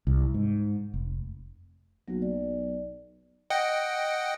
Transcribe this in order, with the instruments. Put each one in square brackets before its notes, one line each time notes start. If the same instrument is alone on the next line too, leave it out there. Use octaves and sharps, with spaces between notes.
[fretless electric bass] C2
G#2
F1
[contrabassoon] B1 [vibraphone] F#3 A#3 F#4
[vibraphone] D5
[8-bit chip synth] D#5 F#5 G5